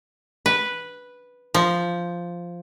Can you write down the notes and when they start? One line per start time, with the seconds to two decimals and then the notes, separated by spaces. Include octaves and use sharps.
0.46 B4
1.54 F3